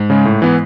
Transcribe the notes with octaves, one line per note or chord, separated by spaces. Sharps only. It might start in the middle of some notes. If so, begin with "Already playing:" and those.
Already playing: G#2
C#3 G#3
A2
E3 B3 E4